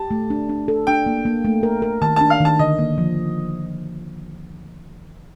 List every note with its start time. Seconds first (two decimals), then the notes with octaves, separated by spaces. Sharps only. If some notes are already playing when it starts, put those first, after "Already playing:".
Already playing: G4 A5
0.11 A3
0.30 D4
0.49 D4
0.68 A4
0.87 D4 G5
1.06 A#3
1.25 A#3
1.45 A3
1.63 A#4
1.82 A#4
2.02 D#3 A5
2.16 D4 A5
2.30 F5
2.40 D#3 A5
2.59 D3 D#5
2.78 A#3
2.98 F3